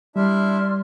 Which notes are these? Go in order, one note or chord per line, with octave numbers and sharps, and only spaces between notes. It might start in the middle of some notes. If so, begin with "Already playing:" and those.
G3 D4 E4 D5 E5 C6 F6